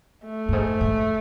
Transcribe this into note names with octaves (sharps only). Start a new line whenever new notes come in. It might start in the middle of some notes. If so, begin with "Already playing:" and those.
A3
G2
G#2
G#2